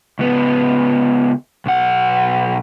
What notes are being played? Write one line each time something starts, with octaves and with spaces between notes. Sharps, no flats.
C#2 B3
B1 F#5